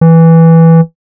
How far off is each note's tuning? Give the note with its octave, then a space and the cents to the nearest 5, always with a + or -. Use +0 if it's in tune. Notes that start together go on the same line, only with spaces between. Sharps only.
E3 -5